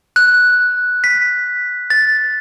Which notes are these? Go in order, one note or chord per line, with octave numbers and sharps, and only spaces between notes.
F#6
B6
A6